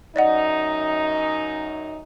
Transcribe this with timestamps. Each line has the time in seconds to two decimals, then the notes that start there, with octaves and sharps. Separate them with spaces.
0.16 F#2 D#4 D5 D#5 F#5